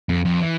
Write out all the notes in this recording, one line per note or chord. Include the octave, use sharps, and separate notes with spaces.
F2
F2
E3